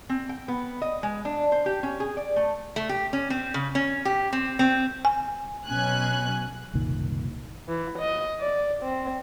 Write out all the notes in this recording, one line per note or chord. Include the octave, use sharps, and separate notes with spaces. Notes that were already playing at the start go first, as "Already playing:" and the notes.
C4
G5
B3
D#5
G#3
D4
C5
G4
C#4
G#4
D5
A3
A3
G4
C#4
C4
C#3
C#4
G4
C4
C4
G#5
B2 F#3 C#4 G#5 F#6
F#1 C2 A#2 D#3
E3
D#5
D5
C4